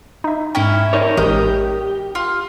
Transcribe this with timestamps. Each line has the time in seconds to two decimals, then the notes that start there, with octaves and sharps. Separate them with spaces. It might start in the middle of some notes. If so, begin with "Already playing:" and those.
0.24 D#4 E5
0.55 G#2 C#4 E4 G5
0.93 D#4 A#4 C#5 D5
1.17 A1 G#3 G4 A#4 D#6 G6
2.15 F4